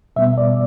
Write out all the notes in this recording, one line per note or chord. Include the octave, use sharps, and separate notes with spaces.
B2 G3 B3 E5
D5